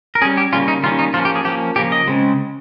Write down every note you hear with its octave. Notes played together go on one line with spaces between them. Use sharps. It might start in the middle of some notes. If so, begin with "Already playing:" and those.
A#4
G3 C#4 G#4
G4
C#3 G3 A#3 C#4 F4
D#4
D#3 G3 A#3 C#4 F4
D#4
F3 A#3 C#4 F4
G4
G#4
F3 A#3 C#4 G4
C#3 F3 A#3 C#4 G4
D#5
C#3 G#3 C4